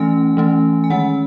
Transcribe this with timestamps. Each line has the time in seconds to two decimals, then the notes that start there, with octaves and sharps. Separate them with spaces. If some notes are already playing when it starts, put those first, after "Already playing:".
Already playing: E3 A3 C#4 G#5
0.37 E3 A3 C#4
0.84 G#5
0.90 D#3 G#3 C#4 F#5